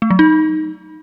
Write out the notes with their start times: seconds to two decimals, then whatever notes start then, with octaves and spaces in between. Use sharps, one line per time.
0.02 A3
0.10 F#3
0.19 D#4